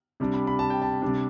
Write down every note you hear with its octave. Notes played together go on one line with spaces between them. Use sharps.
C3 G3 D4
B5
B5
A5
G5
A5
C3 G3 D4